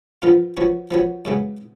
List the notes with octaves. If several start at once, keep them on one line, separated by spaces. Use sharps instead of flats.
F3 B3 F4 A#4
F3 B3 F#4 C#5
F3 B3 F#4 C#5
F#2 C#3 G#3 B3